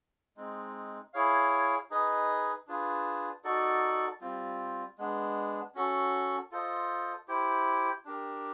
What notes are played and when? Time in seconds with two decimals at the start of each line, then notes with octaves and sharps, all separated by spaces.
0.37 G#3 C4 D#4
1.13 E4 G#4 C#5 F5
1.91 D#4 G#4 B4 D#5
2.68 D4 F4 G#4 B4
3.44 D#4 F#4 A4 D5
4.21 G3 C4 F4
4.98 G#3 B3 D4
5.75 C#4 F#4 A4
6.52 F4 A4 C5 D#5
7.28 E4 G4 C5
8.05 D4 G4 A#4